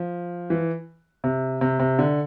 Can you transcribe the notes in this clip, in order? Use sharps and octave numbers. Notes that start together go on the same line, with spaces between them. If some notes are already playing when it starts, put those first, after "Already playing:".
Already playing: F3
E3
C3
C3
C3
D3